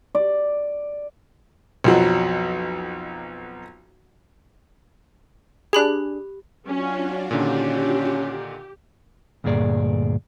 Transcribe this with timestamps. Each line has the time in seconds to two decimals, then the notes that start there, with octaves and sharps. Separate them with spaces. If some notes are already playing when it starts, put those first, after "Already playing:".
0.15 D5
1.84 B1 F2 F#3
5.73 D4 G4 G#4 B5 F#6
6.67 F#3 C#4 D4 F4 F#4
7.31 A#2 D3 D#3 C#4 G4
9.44 D2 G2 A#2 G#4 D5